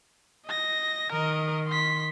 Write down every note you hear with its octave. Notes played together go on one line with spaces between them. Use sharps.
D#5 A#6
D#3 A#4 D#5
C6 B6